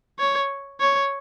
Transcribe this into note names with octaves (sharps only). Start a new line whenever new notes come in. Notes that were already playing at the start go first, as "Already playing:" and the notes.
C#5
C#5